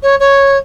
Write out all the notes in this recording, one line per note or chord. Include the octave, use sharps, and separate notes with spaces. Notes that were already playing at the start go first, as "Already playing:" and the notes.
C#5
C#5